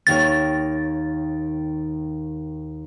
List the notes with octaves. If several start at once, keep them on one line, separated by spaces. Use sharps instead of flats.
D#2 D#3 C#5 A6